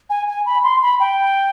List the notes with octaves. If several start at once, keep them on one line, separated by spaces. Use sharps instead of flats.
G#5
G#5
B5
C6
B5
G5